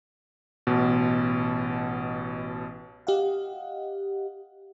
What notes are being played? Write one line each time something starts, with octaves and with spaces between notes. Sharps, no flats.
A1 B2
G4 D#5 F5 F#5